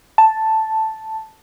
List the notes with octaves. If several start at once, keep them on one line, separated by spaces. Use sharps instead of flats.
A5